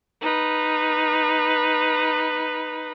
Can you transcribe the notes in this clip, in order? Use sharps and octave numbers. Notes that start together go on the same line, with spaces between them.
D#4 B4